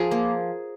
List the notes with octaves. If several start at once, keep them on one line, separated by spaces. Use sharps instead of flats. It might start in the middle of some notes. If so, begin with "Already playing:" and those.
Already playing: F3 G#4 A#4
A#3